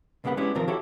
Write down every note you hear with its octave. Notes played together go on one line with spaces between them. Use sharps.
C2 C#3 A#3 B3 F#5 B5
G#3 B3 C#4 D4 E4 G4
D#2 C3 D#3 F3 C4 A#4
E4 F#4 G4 A4 C#5 E5